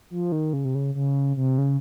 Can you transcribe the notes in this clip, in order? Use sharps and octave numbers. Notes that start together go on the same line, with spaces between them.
F3
D#3
C#3
C3
C#3
C#3
C3
C#3